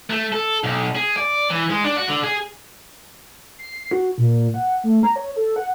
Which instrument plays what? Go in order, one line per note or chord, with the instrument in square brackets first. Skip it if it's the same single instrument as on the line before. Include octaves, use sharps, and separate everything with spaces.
[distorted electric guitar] A3
A4
B1
G#4
D5
E3
G#3
D4
F#4
D3
G#4
[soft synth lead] C7
F#4
A#2
F#5
A3
A#5
C#5
A4
F#5